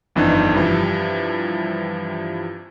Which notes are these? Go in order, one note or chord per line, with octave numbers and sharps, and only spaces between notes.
G1 F2 E3 D4 D#4
G2 C3 E3 F3